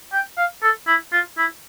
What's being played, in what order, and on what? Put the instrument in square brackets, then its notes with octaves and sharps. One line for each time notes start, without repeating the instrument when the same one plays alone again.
[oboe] G5
F5
A4
E4
F4
E4